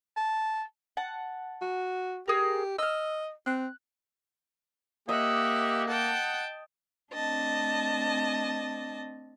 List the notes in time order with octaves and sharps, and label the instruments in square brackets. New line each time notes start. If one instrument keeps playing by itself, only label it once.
[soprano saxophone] A5
[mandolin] F#5 A5
[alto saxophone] F#4
[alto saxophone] G4 [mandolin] G#4 A#4
[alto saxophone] D#5 [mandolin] E6 F6
[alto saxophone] C4 [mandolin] F#6
[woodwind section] A#3 [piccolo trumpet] G4 [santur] D#5 [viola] E5 F#5
[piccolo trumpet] F#5 [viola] G5 A5
[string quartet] A3 C4 D4 D#5 A5